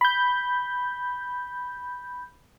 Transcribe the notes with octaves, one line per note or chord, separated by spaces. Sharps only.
B5 G6